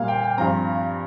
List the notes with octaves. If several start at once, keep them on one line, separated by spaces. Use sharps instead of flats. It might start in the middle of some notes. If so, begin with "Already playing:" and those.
Already playing: A#2 G3 A#3 F5
G5
G5
G2 F3 C4 A#5